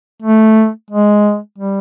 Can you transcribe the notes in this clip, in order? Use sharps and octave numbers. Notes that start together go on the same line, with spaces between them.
A3
G#3
G3